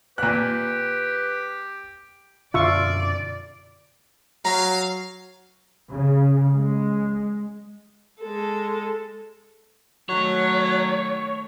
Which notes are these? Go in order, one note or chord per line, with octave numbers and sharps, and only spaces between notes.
A#2 G4 B4 F#6
F#2 B2 D3 F4 D5 E5 C#6 E6
F#3 F5 A#5
C#3
G#3
G#3 A4
D#3 F#3 A3 C#5